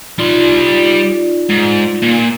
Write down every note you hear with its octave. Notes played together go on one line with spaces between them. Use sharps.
G3 D#4 F4 D5 C6
G#2
A#2